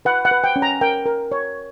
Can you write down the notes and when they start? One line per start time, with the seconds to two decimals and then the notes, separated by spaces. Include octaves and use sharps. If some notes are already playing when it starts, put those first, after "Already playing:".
0.05 B4 F#5
0.25 F#5
0.31 B4
0.44 G5
0.56 C#4
0.62 A#5
0.81 A#4 G5
1.06 A#4
1.32 C#5